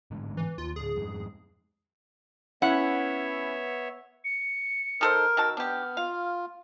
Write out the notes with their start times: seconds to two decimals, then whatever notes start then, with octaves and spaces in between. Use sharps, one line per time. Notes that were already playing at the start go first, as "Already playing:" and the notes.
0.11 A1 G#2 D3
0.37 E3
0.58 D#2 F4
0.76 D2 A2 G#4
0.96 F2 G#2
2.62 B3 C#4 E4 C#5 E5 F#5
4.24 C#7
5.01 D#3 A4 A#4 C5
5.37 D#3 F#4 A5 E6
5.57 B3 D4 G4 F6
5.97 F4 F5